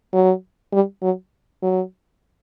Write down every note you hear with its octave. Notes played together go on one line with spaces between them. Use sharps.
F#3
G3
F#3
F#3